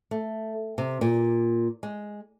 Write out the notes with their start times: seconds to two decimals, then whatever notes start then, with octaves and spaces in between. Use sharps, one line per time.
0.11 A3
0.78 C3
1.01 A#2
1.83 G#3